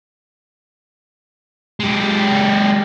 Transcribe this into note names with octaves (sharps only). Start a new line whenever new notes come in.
G#3 G4